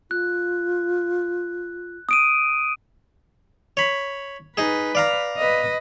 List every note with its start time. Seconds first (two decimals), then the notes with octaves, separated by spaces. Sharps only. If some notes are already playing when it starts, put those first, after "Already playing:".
0.11 F4 F#6
2.09 D#6 D7 D#7
3.77 C#5 B5
4.57 D#4 G#4 B4
4.95 D5 F5 A#5
5.37 B4 D#5